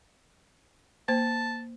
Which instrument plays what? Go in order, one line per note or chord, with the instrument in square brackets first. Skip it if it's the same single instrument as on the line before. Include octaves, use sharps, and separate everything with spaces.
[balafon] A#3 C5 [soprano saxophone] A5